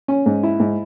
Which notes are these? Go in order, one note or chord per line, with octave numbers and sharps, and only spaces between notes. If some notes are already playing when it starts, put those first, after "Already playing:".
C#4
G#2
E4
G#2